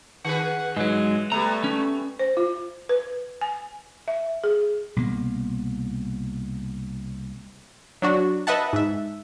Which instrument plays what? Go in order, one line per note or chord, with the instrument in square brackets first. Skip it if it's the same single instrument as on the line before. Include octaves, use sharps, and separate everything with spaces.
[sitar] D#3 G#4 B4 [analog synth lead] F#5
[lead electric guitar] G#2 F#3 [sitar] E3 [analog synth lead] G#3
[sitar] G3 B3 [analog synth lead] A3 [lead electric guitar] A#5
[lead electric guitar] C#4
[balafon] C5
F4
B4
G#5
E5
G#4
[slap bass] C2 B2 A#3
[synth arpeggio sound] F#3 D4 F#4
B4 D#5 E5 F#5 A5
G#2 E5